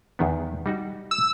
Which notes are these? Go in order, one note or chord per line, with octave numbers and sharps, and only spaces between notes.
E2 D#3 B3
G3 D#4 F#4
E6